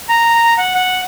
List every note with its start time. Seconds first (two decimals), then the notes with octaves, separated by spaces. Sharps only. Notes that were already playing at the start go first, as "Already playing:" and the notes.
0.09 A#5
0.58 F#5
0.75 F#5